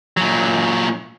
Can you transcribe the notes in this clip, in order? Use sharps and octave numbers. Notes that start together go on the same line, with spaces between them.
A#2 F#3